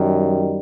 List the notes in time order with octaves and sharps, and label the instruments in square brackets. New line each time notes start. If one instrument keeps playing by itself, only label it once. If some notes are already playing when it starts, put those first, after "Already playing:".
Already playing: [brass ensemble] F#2 D#3 G3